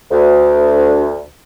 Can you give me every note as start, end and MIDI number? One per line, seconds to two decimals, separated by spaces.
0.11 1.20 38